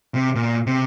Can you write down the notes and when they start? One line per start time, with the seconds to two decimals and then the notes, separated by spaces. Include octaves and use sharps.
0.15 C3
0.35 A#2
0.66 C3